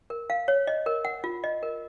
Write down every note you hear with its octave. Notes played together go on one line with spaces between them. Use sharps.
A#4
F5
C#5
D#5
A#4
F#5
F4
D#5
A#4